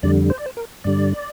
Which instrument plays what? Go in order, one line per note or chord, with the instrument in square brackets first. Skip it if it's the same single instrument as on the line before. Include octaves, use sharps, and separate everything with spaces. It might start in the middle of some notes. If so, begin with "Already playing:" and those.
[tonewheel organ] F2 D3 G3 D5
C5
D5
C5
A#4
G2 D3 G3 D5